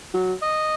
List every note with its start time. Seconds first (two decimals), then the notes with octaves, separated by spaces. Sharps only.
0.14 F#3
0.42 D#5